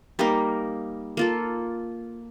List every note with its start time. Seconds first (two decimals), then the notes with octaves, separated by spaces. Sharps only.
0.19 G3 A#3 D#4 A#4
1.17 A#3 F4 A4